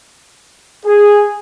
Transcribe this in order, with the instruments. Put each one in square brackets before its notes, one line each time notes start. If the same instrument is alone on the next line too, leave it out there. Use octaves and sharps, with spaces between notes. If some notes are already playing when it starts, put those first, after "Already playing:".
[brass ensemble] G#4